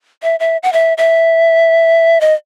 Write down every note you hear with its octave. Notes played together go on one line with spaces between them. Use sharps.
E5
E5
F#5
E5
E5
D#5